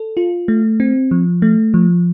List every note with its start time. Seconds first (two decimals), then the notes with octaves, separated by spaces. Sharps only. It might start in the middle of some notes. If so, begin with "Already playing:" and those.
Already playing: A4
0.17 F4
0.48 A3
0.80 C4
1.11 F3
1.42 A3
1.74 F3